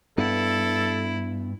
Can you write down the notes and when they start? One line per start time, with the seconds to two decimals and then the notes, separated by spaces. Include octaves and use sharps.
0.18 G2 B3 E4 A4